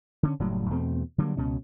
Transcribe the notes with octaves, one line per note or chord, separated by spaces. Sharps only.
D3 C4 C#4
F#1 A2 F#3 G3
E2 B2 A3 C4
D3 F#3 G3 A#3
C#2 B2 C#4